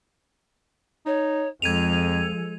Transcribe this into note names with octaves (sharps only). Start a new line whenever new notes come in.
D#4 C#5
F2 F3 G#3 A4 G#6 D#7 F7